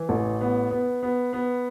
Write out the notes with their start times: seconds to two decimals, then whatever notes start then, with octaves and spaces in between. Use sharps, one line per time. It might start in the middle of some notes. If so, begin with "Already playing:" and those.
Already playing: E3
0.09 A1
0.41 B3
0.71 B3
1.03 B3
1.33 B3